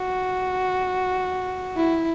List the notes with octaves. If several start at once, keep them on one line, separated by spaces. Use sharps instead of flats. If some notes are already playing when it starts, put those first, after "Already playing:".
Already playing: F#4
E4